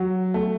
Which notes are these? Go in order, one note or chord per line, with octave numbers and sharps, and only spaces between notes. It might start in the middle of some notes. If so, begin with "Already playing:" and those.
Already playing: F#3
A3